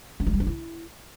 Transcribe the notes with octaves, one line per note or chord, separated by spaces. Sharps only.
C#4
G3
C4
C#4
E4